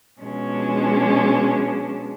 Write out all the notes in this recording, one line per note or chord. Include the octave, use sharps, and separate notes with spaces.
B2 F3 G#3 C#4 D4